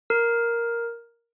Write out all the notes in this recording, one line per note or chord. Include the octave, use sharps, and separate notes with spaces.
A#4